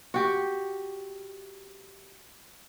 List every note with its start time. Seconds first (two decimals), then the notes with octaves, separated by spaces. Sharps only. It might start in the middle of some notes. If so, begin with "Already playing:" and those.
0.14 F#4 G4